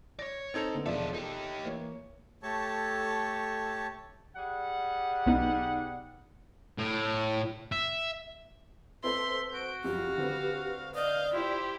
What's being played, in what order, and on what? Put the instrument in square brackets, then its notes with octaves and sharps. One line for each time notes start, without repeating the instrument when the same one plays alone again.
[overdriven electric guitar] C#5 D5 [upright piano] A#6
[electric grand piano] C4 D#4 A4 [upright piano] G#6 C#7 F7
[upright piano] D3 A#3 B3
[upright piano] E1 F3 D5 [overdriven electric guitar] D#4 A4 [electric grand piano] E5
[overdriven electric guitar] D#4 G4 [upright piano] A4
[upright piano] E3 A#3 C#5
[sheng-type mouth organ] A3 G4 A4 C#5 A5 C#6
[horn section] G3 G#4 F#5
[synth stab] B1 B3 D#4
[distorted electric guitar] A2
E5
[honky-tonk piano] C4 A4 C5 [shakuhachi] B4 [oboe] E5 [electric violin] C6
[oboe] F#4 [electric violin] G6 D7
[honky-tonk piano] F#1 F3 [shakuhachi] G4 [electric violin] F5
[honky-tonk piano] D3 C4 B4
[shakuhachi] D5 [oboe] D#5 [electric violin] F5 G6
[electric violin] E4 G4 [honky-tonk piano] F4 [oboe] C5